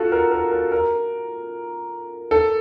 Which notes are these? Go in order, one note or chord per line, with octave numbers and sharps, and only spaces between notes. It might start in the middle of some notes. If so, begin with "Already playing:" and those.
Already playing: F4 F#4 A4
A#4
A#4
A#4
A#4
A4